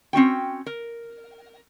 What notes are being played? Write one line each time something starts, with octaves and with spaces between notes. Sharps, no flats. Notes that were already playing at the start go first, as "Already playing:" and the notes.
C4 C#4 F#4 G5
A#4